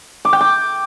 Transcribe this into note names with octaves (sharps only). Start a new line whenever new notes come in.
D6
G5
D6